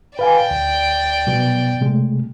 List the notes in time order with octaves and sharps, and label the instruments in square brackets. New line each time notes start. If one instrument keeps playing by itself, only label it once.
[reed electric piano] B4 F5 G#5 [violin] D5 G5
[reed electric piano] D2
B2 F#3 B3
C3 G#3 A3